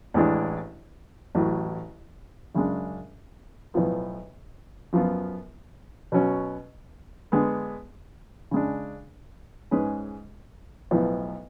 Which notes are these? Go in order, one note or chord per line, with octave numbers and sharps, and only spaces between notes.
A1 A2 G#3 D4
A1 A2 F#3
F#2 C#3 G#3 D4
B1 A2 F3 B3
F#2 F3 B3 F4
B2 F#3 C#4
D3 G#3 B3
C#3 G#3 D4
G#2 G#3 C#4 G#4 B4
B1 A2 F3 B3